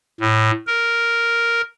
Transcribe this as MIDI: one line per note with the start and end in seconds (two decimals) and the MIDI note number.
0.21 0.51 45
0.67 1.61 70